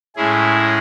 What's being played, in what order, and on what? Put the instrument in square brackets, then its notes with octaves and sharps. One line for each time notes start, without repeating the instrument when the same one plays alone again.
[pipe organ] A2 G#3 C#4 E4 G#4